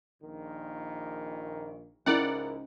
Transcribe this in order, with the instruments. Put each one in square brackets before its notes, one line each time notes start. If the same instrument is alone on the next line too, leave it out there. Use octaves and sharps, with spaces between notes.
[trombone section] A#1 A#2 D#3
[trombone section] C#2 G#2 D#4 [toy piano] C#4 [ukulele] E4 A#4 [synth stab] D5 F#5